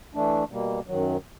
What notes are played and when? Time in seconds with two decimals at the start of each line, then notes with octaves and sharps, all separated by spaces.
0.15 E3 A3 D4
0.51 B2 G3 A#3
0.87 F#2 D#3 F#3